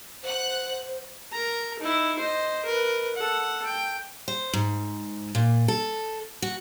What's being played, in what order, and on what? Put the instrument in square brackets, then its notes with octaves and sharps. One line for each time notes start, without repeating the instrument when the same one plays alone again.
[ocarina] C5 [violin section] F#5 F#6
[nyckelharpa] A#4 A#5
D#4 E4
C5 D#5
A#4 B4
A4 F#5
G5
[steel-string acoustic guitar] C5
G#2
A#2
A4
F#4